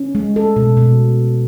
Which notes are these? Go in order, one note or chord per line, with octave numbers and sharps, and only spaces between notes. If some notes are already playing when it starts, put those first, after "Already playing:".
Already playing: C#4
G#3
A4
B2
B2